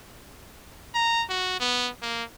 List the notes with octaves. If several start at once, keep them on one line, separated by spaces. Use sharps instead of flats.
A#5
F#4
B3
A#3